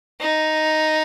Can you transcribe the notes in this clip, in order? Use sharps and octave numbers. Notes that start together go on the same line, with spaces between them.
D#4